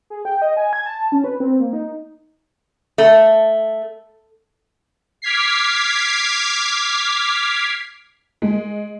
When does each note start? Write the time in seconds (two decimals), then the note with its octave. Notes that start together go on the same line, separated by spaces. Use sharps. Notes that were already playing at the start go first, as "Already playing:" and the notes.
0.10 G#4
0.25 G5
0.42 D#5
0.57 G#5
0.73 G#6
0.86 A5
1.12 C#4
1.24 B4
1.40 C4
1.60 A#3
1.73 D#4
2.98 A3
5.22 D6 F6 G#6 B6 C7
8.42 G#3